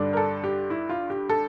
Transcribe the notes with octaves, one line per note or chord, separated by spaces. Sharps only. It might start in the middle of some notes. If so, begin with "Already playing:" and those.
Already playing: G2 D3 G3 D4
A#4
A4
G4
E4
F4
G4
A4